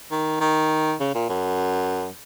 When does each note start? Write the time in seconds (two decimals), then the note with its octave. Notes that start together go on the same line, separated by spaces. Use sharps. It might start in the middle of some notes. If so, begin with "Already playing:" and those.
0.11 D#3
0.40 D#3
1.00 C#3
1.15 A#2
1.29 F#2